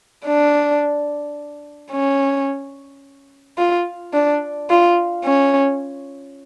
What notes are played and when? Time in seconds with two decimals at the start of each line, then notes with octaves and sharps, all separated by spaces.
0.25 D4
1.91 C#4
3.58 F4
4.13 D4
4.70 F4
5.24 C#4